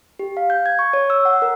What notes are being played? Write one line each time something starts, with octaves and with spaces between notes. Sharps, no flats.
G4
F5
G6
G#6
C#6
C#5
E6
F#5
A#4